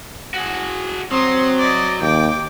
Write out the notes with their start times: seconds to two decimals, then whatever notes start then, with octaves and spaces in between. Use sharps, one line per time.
0.34 F#4 G#4
1.12 F#3 C4 C6 D#6
1.59 D5 D#5
2.01 D#2 G5 D6